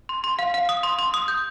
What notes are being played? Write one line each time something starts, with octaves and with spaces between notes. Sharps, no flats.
C6
C6
F5
F5
D#6
C6
C6
D#6
G6